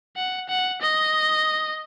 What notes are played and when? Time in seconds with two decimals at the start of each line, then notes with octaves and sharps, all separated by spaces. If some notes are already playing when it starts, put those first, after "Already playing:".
0.17 F#5
0.49 F#5
0.81 D#5